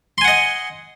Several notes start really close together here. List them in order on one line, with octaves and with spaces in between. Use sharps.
C6 G#5 F#5 D#5